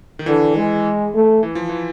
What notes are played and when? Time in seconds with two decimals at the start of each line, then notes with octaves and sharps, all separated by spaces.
0.19 D#3
0.26 D3 E3
0.55 G#3
1.14 A3
1.43 E3
1.55 F3
1.69 E3